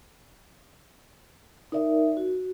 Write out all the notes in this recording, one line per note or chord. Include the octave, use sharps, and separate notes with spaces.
D#4 A#4 D5 E5
F#4